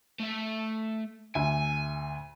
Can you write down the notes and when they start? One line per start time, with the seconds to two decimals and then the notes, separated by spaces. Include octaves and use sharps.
0.20 A3 E5
1.35 D2 E5 G#5